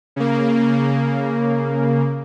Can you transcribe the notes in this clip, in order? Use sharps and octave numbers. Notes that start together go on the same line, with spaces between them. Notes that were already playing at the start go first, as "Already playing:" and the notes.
C#3 A#3